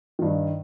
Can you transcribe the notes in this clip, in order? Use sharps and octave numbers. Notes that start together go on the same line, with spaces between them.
G2 D#3